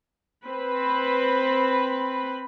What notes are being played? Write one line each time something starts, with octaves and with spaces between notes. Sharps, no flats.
C4 B4 B5